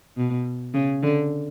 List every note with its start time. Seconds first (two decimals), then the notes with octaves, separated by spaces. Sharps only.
0.17 B2
0.74 C#3
1.03 D3